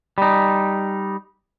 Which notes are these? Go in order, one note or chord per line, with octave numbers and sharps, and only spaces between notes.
G3 D#4